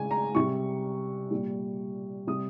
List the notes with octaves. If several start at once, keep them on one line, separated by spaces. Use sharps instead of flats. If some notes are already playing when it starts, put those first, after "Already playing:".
Already playing: C#3 G#3 G#5
A#5
C3 G3 C#6
A#2 G3
C3 G3 D#6